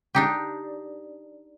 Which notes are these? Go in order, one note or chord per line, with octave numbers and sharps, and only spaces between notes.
D4 D#4 G4